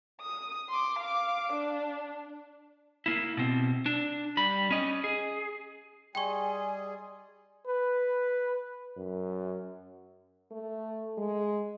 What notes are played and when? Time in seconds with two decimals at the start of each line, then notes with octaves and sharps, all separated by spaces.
0.21 D#6
0.69 C6 D6
0.98 F5 D6
1.52 D4
3.06 A#3 E4
3.37 B2 C4
3.86 D4
4.37 G3 B5
4.71 C#4 D#5
5.04 G#4
6.15 G3 G#4 D#5 G5 G#5 C6 C#6
7.67 B4
8.97 F#2
10.51 A3
11.18 G#3